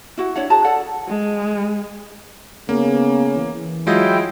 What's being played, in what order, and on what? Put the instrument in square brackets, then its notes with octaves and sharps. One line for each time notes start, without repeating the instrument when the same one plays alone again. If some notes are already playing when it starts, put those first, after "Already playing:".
[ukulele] E4 F#4 F#5
D4 E4 C#5 F#5
F#4 G#4 A5 A#5
A4 D5 F#5
[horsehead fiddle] G#3
[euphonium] C#3 [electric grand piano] A#3 [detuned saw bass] B3
[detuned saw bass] E3
[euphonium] F#3 [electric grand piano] G#3 F4 D#5 [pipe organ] E4 G5